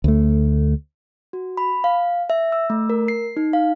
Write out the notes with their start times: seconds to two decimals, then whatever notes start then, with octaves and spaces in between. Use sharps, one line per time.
0.04 D2 A3
1.33 F#4
1.57 B5
1.84 F5
2.30 E5
2.52 E6
2.70 A3
2.90 A#4
3.08 C7
3.37 D#4
3.53 F5